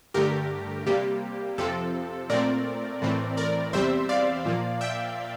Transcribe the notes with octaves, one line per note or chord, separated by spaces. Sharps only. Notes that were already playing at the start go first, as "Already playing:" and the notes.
G2 D3 A3 G4 A#4
C3 G3 A#3 G4
F2 C3 F3 C4 A4
A#2 A3 C4 A#4 D5
A2 E3 A3 C4
A#4 D5
E2 C3 G3 C4 C5 E5
D5 F5
A#2 F3 A#3
E5 G5